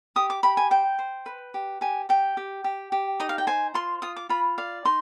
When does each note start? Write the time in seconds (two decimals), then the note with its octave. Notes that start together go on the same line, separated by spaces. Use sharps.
0.16 G4 D#6
0.30 D6
0.43 G4 B5
0.57 G#5
0.71 C5 G5
0.99 C5
1.26 B4
1.54 G4
1.81 G4 G#5
2.09 G4 G5
2.37 G4
2.64 G4
2.92 G4
3.20 D#4 D#5
3.29 F5
3.38 G5
3.47 C5 G#5
3.74 F4 C6
4.02 F4 D#6
4.16 D6
4.29 F4 B5
4.58 D5 F5
4.85 D#4 C6